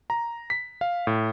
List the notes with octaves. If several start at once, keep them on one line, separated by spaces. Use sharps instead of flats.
A#5
B6
F5
A2